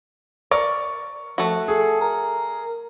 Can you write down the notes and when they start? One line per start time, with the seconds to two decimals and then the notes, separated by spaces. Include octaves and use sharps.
0.51 A#4 D5 C#6
1.38 F3 A3 F#4
1.68 G#4 A4
2.01 A#4